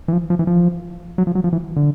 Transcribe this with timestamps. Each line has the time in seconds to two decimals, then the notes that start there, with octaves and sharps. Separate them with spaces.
0.08 E3
0.13 F3
0.30 F3
0.39 E3
0.47 F3
1.18 F#3
1.27 F3
1.35 F#3
1.44 F3
1.53 E3
1.76 D3